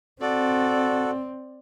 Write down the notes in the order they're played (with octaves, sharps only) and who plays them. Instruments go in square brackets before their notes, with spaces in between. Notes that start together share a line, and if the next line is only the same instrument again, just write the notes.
[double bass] C4 [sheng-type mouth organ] F#4 A4 [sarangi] D5